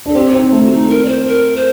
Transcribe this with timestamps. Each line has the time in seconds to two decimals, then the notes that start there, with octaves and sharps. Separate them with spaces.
0.06 D4 A4
0.15 C4 G4
0.33 C4 D#4
0.52 A3 D#4
0.66 F#4
0.72 D#4
0.90 A#4
1.05 D5
1.09 C5
1.28 A#4
1.56 C5